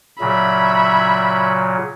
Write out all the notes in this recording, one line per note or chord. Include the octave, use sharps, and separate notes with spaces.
A#2 C#3 F#3 E5 B5